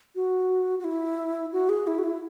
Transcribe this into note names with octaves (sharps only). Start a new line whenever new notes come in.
F#4
F#4
E4
F#4
G#4
E4
F#4
E4